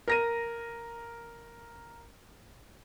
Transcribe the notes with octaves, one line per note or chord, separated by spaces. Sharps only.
A#4 A#6 D#7